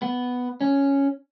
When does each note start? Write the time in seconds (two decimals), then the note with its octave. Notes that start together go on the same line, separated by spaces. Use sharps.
0.02 B3
0.61 C#4